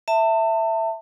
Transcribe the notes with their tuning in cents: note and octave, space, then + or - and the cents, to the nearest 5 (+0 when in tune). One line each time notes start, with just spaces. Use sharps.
E5 +0 A5 +35